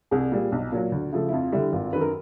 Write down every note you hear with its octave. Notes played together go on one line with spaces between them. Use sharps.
C2 G#4
A#2 G3
B1
A#2 F#3
D2
C#3 F3 A3
E4
F2 F4
D3 G3 E4
G#1 F4
F#2 D#3 B4
A#4